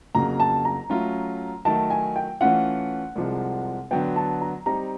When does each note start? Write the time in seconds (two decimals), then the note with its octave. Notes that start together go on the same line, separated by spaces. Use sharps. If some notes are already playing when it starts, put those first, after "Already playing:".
0.15 F2 C#3 F#3 A#3 A#5
0.40 A5
0.65 A#5
0.90 F#3 A3 C#4 F4
1.65 D#3 F#3 A3 A5
1.90 G#5
2.16 G5
2.41 E3 A3 C#4 F4 F#5
3.15 C2 C3 F3 G#3
3.91 D3 F#3 B3 G5
4.16 A5
4.41 A#5
4.66 G3 C4 D#4 A#5